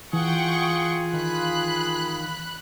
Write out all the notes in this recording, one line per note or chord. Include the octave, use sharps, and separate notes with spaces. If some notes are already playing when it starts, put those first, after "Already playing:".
E3 F4 G#4 F#5 G5 C#6
D#3 B5 F#6